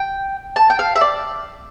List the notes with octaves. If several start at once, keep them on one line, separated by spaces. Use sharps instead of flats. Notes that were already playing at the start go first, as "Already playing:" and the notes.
Already playing: G5
A5
G5
F5
E5
D5